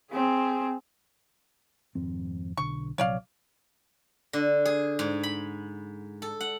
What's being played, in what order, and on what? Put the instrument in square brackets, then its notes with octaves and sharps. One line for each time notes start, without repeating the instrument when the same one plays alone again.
[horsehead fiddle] C4 G#4
[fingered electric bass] G#1 F2 C4
[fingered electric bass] B1 D3 [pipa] C#6
[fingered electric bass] A#1 C3 F#3 [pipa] C#5 D5 F5
[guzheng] D3
G#4
G#2
B5
A4
F#5